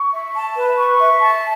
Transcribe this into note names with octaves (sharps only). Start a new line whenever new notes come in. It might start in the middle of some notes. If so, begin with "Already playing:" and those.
Already playing: C#6
E5
A5
B4
C#6
E5
A5